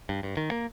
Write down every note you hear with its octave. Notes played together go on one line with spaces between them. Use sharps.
G2
G2
D#3
A#3